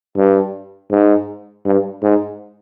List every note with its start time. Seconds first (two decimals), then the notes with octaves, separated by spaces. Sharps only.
0.17 G2
0.91 G#2
1.65 G2
2.03 G#2